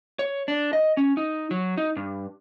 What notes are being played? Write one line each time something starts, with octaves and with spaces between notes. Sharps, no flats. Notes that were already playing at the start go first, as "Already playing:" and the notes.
C#5
D4
D#5
C#4
D#4
F#3
D#4
G2